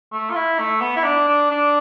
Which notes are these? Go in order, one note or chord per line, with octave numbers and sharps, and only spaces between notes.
A3
F4
E4
A3
B3
E4
D4
D4
D4